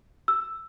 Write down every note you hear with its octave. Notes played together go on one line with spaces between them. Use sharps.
E6